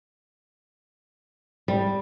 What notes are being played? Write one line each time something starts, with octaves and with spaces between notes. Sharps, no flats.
G3